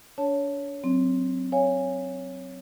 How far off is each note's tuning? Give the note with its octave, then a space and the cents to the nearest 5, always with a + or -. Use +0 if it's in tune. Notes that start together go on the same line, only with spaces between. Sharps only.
D4 -40 C#5 +10 A5 +0
F#3 +0 C4 +0
C#5 +0 F5 +0 G#5 -15